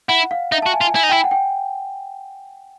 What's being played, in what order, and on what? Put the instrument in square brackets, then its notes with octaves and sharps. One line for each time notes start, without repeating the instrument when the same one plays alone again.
[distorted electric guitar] E4 [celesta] F#5
[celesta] F5
[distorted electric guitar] D#4 [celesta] E5
[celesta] A5
[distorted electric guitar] F#4
[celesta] G#5
[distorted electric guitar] F4
[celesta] G#5
[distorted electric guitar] E4 [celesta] G#5
[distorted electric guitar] D#4
[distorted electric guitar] E4 [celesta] G5
[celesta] F#5
G5